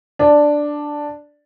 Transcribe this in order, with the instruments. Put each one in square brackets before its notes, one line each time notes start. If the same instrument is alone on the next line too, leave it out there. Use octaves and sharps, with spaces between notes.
[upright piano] D4